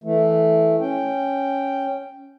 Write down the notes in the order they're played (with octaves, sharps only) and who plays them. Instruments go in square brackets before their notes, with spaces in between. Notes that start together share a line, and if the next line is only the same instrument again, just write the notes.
[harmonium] E3 A3
C#4 G5